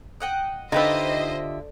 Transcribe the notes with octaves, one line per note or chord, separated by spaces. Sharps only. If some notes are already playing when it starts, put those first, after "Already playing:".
D#5 F#5 G5
D3 D#4 F4 G4 B4 C5 D#5 E5